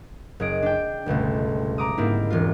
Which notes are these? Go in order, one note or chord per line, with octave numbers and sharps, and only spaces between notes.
F#1 G#4 D#5 D7
D4 G5
G1 C#2 B2 A3
A#5 D6 D#6
G#2 A#3 C4 D4 E4
E1 F4